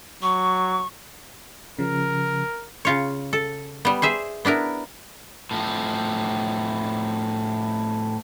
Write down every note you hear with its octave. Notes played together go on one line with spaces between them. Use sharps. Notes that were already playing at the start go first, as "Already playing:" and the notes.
F#3 C#6
C#3 F3 A#4
C#3 F4 C#5
A4
G3 B3
G#4 C5 E5
B3 D4 E4 A#4
A2 F3